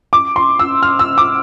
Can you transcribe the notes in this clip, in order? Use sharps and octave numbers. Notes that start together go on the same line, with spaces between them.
D6
C6
E6
F6
E6
D6